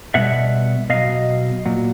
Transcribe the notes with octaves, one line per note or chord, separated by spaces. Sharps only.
B2 G3 E5 F#5
B2 F#3 D#5 F5
A#2 F#3